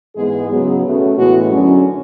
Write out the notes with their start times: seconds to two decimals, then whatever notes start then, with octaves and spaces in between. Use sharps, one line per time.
0.16 G#2 E3 G#3 B3 G#4
0.50 C#3 F#3 B3
0.84 B2 A3 C#4
1.17 A2 E3 G#3 B3 F#4
1.51 F#2 D3 F#3 C#4